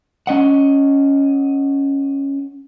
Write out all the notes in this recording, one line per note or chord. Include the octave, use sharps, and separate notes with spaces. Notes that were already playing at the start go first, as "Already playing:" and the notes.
C#4 D#5 F#5